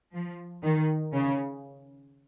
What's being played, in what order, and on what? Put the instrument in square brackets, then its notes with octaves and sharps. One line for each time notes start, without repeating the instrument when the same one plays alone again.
[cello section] F3
D#3
C#3